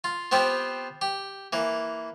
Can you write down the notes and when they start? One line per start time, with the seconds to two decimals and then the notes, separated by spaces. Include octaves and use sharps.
0.04 F4
0.32 B3 C4 F4 G4
1.01 G4
1.53 E3 A#3